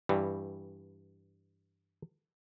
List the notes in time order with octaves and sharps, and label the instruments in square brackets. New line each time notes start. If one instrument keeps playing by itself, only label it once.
[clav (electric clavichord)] G2 E3 G3